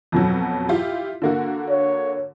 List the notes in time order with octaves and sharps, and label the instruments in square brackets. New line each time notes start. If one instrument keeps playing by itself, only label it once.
[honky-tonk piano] F2 B2 F#3
E4 F4 G4
D3 A#3 F#4
[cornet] C#5